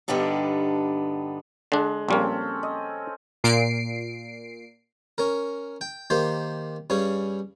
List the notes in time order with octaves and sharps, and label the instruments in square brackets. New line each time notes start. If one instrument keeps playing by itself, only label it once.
[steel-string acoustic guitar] G2 D3 G3 B3 D4 D#4
[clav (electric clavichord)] D3 D4 [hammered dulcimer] G#3
[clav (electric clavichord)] A#1 G3 A#3 [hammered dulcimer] C4 C#4 A4
[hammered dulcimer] D#5
[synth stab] A#2 C7 D7
[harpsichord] C#4 A#4
G5
D#3 A#3 G4 C5
G2 C#4 G#4